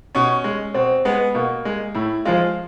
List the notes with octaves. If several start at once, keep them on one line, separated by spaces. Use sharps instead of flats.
B2 C#4
G#3
B2 C4
G#3 B3
B2 A#3
G#3
A2 E4
F3 G#3 F4